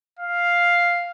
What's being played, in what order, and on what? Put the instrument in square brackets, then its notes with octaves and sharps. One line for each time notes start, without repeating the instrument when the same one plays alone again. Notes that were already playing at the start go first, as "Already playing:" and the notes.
[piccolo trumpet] F5